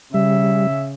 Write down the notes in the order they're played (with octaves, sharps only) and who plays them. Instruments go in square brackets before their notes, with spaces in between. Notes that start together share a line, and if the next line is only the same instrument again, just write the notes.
[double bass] C#3 [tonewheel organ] G3 [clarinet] E5